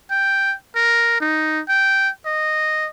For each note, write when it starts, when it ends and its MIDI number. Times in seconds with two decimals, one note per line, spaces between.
0.11 0.55 79
0.75 1.16 70
1.21 1.61 63
1.69 2.09 79
2.26 2.88 75